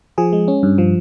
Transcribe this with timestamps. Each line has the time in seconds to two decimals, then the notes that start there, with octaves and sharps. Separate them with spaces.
0.18 F3 G#4
0.33 G#3
0.48 C#4
0.63 G2
0.78 F3